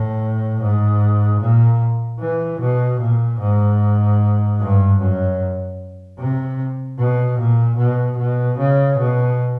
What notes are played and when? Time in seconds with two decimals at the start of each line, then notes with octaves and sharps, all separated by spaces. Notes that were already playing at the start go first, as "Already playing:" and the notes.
Already playing: A2
0.61 G#2
1.41 A#2
2.20 E3
2.60 B2
3.00 A#2
3.40 G#2
4.60 G2
4.99 F#2
6.18 C3
6.98 B2
7.38 A#2
7.77 B2
8.17 B2
8.58 C#3
8.98 B2